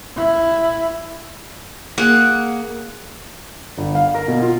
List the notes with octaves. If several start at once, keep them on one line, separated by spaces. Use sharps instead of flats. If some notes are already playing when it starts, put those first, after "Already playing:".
E4
A#3 G#4 F#5
G1
F5
A#4
B2
F4